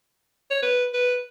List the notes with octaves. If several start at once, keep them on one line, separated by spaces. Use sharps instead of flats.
C#5
B4
B4